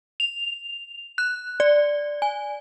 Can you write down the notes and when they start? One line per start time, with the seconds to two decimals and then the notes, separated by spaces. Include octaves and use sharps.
0.20 F7
1.18 F#6
1.60 D5
2.22 G#5